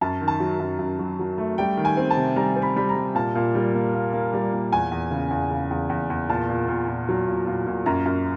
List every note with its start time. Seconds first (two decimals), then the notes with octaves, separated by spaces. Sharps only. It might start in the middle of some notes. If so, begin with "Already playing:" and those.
0.01 F#2 A5
0.21 D#3
0.28 A5
0.40 F#3
0.60 F#2
0.79 F#2
0.99 F#3
1.19 F#3
1.38 A3
1.58 G3 G5
1.77 D#3
1.85 G#5
1.97 C4
2.10 A5
2.17 C3
2.36 G3 A#5
2.56 C4
2.62 B5
2.76 G3 B5
2.89 A#5
2.95 G3
3.15 A#2 A5
3.35 A#2
3.55 G3
3.75 A#3
3.94 A#3
4.13 A#3
4.34 G3
4.53 A#2
4.72 E2 G#5
4.92 E2
5.11 C#3
5.31 E2
5.51 C#3
5.71 E2
5.90 E2
6.10 E2
6.29 A#2 A5
6.49 A#2
6.68 A#2
6.88 A#2
7.09 F#3
7.28 A#2
7.47 A#2
7.67 A#2
7.86 F#2 A#5
8.06 F#2